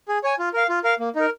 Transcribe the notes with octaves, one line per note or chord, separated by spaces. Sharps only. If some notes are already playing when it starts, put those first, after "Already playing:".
G#4
C#5 G#5
F4
A#4 F5
F4
A#4 F5
A#3
D#4 A#4